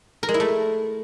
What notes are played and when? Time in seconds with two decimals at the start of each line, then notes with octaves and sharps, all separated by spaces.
0.23 A#4
0.29 G#3
0.34 E4
0.40 A3